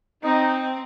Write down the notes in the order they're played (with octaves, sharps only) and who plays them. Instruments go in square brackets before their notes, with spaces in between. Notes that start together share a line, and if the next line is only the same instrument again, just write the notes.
[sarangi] C4 [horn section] D#4